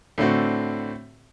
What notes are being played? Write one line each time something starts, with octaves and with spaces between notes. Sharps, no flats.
A2 D3 C4 F#4